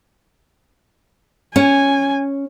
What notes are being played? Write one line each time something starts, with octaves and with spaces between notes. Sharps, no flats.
C#4 G#5